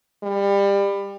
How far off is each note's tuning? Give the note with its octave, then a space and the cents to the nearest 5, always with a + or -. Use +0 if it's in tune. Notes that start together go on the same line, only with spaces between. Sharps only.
G3 +25